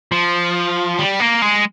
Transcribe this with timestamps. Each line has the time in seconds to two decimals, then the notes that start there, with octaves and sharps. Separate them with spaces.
0.12 F3
0.99 G3
1.20 A#3
1.42 G#3